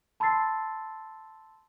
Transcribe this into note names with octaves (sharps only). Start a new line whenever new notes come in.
A5 B5 C6 E6 A6 C7